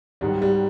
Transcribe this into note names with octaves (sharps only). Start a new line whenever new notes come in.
G#2 D#3 F#3 G3
G3